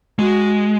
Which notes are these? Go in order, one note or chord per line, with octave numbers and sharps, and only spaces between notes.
G#3 F#4